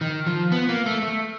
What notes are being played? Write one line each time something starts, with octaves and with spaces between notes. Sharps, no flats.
D#3
F3
B3
A#3
A3
A3